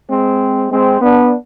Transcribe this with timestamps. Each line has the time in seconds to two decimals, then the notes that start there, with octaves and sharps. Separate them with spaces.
0.09 G#3 C4
0.70 G#3 C4
1.00 B3 D4